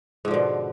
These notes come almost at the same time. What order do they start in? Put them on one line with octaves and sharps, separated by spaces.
G#2 F3 D3 B2